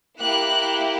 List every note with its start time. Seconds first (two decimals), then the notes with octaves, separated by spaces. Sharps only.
0.18 A#3 E4 G4 F#6